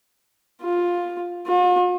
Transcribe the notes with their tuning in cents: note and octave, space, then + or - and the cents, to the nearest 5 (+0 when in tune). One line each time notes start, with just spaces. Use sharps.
F4 +10
F4 +45